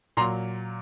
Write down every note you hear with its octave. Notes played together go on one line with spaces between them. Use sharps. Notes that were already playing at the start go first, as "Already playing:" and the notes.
A#2 F#3 A#5 C6